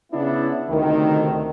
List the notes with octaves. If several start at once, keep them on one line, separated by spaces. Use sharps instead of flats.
C#3 B3 D4 E4
D2 A2 C3 D#3